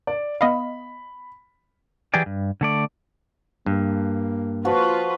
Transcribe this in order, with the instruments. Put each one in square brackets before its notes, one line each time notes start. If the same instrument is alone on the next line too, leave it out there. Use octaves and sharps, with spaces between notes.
[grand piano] D5
[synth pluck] B3 D#5 F5 [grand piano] B5
[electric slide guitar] E3 F#3 G4 G#4 D5
G2
D3 A3 D5
[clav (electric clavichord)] G2 [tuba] A#3
[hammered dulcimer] F3 F#4 [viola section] F4 B4